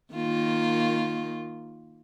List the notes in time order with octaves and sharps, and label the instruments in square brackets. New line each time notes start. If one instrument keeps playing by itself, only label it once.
[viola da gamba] D#3 A#3 F4